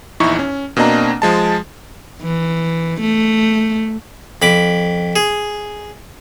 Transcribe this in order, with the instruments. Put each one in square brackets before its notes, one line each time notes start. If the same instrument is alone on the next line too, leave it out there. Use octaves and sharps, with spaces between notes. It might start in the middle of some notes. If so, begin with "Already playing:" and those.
[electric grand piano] A#1 E2 D#4 E4 C#6
C#4
B2 A#3 C4 D4 D#5 A#5
F3 G#3 A5
[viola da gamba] E3
A3
[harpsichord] F2 B5 D6
G#4